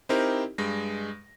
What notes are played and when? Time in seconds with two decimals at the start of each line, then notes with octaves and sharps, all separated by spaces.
0.09 C4 D#4 E4 G4 A#4 C5
0.58 G2 G#3 A#6